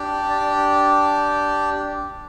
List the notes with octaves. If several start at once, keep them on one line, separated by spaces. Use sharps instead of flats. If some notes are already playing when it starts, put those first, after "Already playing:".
Already playing: D4 G4
D5